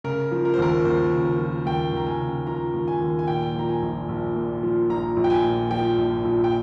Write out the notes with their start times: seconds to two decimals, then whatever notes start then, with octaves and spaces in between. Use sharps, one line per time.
0.04 C#3 A#4
0.32 F3
0.45 A#4
0.54 C5
0.58 D#2 A#4
0.85 D#2 C5
1.12 C#3
1.25 A#4
1.39 F3
1.65 D#2 G5
1.93 D#2 A#5
2.07 G#5
2.21 C#3
2.47 F3 A#5
2.74 D#2
2.88 G#5
3.01 D#2
3.19 G#5
3.28 A#2 G5
3.55 F3 A#5
3.69 G#5
3.82 A#1
4.09 A#1
4.36 A#2
4.63 F3
4.89 A#1 A#5
5.17 A#1
5.24 G5
5.30 G#5
5.43 A#2
5.71 F3 G5
5.98 A#1
6.25 A#1
6.44 G5